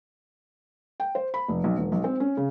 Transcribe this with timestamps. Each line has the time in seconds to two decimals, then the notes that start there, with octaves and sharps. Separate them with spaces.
1.00 G5
1.15 C5
1.34 B5
1.48 F1
1.64 B1
1.78 E1
1.92 B1
2.04 C4
2.20 C#4
2.37 C#3